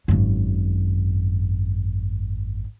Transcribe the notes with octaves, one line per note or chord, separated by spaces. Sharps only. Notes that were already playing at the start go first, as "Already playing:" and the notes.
G#1 F#2